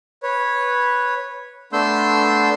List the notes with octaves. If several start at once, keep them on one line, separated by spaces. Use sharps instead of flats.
B4 C#5
A3 B3 D4 C6 E6 G6